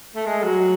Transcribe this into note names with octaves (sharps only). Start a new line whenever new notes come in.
A3
G#3
F#3